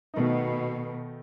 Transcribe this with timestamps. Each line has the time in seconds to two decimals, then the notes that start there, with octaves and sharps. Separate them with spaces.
0.14 B2 D#3 A3 D#4